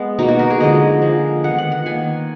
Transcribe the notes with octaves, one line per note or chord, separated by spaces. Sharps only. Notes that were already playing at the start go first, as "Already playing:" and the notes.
Already playing: G#3 B3
B2 A#3 D#4
F#4
A#4
G#4
D3 F3 G#3 D#5
F3 A#3
D#3 G#3 B3 F#5
F#5
F#5
D#3 A#3 G#5